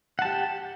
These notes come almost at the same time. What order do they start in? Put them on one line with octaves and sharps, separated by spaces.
F#5 A5 G4